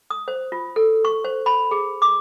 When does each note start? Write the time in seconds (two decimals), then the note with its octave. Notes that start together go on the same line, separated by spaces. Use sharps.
0.10 D#6
0.28 C5
0.52 F4
0.76 A4
1.05 C#6
1.24 C5
1.46 B5
1.71 G#4
2.02 D6